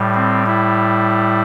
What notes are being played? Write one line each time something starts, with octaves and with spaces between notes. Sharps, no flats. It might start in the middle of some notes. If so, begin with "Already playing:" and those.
Already playing: A2 G3
C4
E4